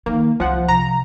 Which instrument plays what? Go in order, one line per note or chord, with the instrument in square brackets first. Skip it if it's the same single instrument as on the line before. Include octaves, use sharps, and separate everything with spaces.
[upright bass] D#3 [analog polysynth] A#3
[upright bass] C2 [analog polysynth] F3 F#5
[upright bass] C3 F3 [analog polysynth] A#5